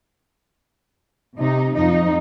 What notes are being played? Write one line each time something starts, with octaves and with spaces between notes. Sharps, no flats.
C3 D#4
F2 F3 D#4